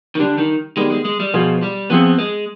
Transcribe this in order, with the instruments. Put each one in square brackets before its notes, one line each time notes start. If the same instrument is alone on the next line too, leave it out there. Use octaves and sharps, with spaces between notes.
[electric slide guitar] D#3
[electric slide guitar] D3 [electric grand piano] G3 D4 G4
[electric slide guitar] D#3
[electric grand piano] D#3 G3 B3 [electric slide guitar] G#3
[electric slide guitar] G#3
G#3
G3
[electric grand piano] B2 B3 F4 G#4 [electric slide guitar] F3
[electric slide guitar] G3
[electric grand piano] F3 C4 F4 G#4 [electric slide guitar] B3
[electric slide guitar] G#3